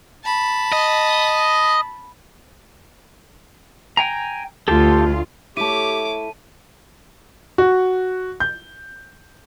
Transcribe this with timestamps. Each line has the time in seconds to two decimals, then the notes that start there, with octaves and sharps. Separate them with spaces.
0.24 A5 B5
0.72 D#5
3.97 G5 G#5 A#5
4.68 D2 F4 G4 A4
5.57 A3 E4 G4 C#5 A5 D6 D#7
7.58 F#4
8.40 G6